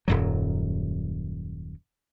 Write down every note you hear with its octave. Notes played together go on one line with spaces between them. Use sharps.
D#1 F#2 F#3